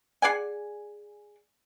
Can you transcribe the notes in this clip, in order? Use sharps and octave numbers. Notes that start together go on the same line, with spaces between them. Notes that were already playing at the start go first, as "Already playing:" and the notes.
G#4 D5 F#5 G#5